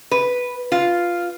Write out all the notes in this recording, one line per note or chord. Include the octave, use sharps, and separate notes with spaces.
B4
F4